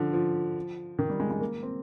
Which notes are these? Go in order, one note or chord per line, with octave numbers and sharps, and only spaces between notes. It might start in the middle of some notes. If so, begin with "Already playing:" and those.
Already playing: D3 F3
F3
D#3
G3
G#3
G#3
A#3
C4